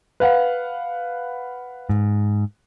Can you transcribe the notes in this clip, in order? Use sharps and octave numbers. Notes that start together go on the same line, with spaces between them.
B4 F5 F#5
G#2